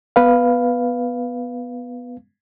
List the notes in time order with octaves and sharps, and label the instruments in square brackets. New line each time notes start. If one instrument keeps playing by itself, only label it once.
[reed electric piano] B3 B4 F5